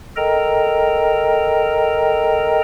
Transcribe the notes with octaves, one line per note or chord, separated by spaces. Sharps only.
A4 A#4 D#5 G5 A#5